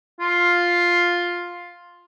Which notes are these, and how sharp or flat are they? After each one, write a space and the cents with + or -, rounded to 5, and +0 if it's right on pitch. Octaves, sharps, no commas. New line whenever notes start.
F4 +5